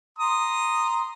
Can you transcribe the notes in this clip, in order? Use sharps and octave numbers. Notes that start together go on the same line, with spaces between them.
A#5 C6 D#6